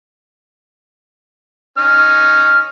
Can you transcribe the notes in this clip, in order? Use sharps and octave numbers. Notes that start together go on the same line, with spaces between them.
C#4 D#4 F6